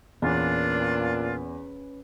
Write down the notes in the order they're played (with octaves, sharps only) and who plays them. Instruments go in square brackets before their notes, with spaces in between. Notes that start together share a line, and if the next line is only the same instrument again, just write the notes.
[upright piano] E2 [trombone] A#2 [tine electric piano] C#4 B4 [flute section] D4 F4